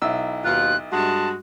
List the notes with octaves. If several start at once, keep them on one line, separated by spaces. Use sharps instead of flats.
B1 E4 E6
D#2 B2 F4 F#6
G2 G#3 F#4 A5